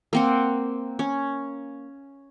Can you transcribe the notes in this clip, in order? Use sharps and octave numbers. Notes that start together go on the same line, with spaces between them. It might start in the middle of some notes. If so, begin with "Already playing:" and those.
A#3 C4 F#5
C#4